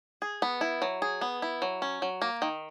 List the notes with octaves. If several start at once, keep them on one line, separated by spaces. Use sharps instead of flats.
G#4
B3
E4
F#3
G#4
B3
E4
F#3
C#4
F#3
A#3
D#3